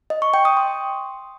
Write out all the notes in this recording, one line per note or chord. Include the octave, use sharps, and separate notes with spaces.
D#5
C#6
G5
D#6
C6